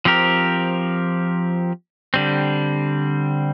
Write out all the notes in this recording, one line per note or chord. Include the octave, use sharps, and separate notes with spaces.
F3 C4 G4 A#4
D3 G3 C4